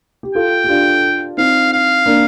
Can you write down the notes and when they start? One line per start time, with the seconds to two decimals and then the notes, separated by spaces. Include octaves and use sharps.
0.23 G4
0.35 F4 A4 G5
0.64 G4
0.69 D4 F4
1.37 C4 D#4 F5
1.73 F5
2.06 A#3 D4